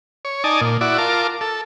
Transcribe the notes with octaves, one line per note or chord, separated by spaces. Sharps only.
C#5
D#4 D5 G#5 A5
A#2
E4 F#4 D5
F4 A#4 A5 D6
A4